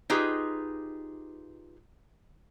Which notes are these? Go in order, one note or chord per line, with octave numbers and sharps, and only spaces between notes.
D#4 F4 G4 G#4 B4